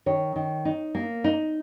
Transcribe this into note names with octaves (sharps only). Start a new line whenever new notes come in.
D#3 C#5
D#3
D#4
A#3
D#4